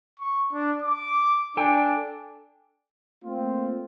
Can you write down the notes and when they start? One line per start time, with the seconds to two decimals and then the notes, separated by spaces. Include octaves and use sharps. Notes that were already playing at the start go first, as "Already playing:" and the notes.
0.20 C#6
0.53 D4
0.82 D6
1.57 D4 A4 G5 G#5
3.24 A3 A#3 C4 F4